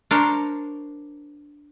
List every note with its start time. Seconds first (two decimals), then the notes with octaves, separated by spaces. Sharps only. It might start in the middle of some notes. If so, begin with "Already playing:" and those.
0.11 D4 A#4 C5 C#5